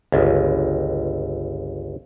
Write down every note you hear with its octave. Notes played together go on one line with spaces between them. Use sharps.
G1 C#2